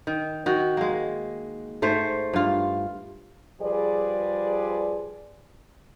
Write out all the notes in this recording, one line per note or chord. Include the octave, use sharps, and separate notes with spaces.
D#3
D#3 F#4
G#3 A#3
G#2 A3 C5
G2 F4
F3 G3 G#4 B4 D5